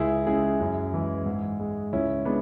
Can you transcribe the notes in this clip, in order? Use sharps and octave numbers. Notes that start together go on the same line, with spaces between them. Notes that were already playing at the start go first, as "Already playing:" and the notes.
Already playing: C#2 E4 G#4
C#3 G#3 E4 G#4
F#2
E3 G#3
G#2
G#3
C#2 C#4 E4
G#3 B3 D4